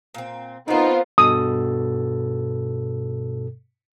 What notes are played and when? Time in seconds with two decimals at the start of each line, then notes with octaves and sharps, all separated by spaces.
0.14 A#2 C4
0.68 B3 C4 D#4 F4 A#4 C5
1.18 G2 B2 A4 D#6